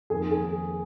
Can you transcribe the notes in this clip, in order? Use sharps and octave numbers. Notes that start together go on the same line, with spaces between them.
F2 D#3 A#3 G#4
G#4